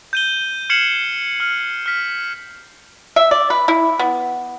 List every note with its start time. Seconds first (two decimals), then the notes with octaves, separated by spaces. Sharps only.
0.13 G6 D#7 G7
0.70 F6 G#6 C7 C#7 E7 F#7
1.40 F6
1.86 F6 B6
3.16 E5
3.31 D5
3.50 B4
3.68 E4
3.99 B3